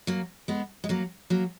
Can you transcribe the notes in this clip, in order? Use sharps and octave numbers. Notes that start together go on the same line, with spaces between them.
F#3 A#3
G#3 B3
G#3
F#3 A#3
F#3 A#3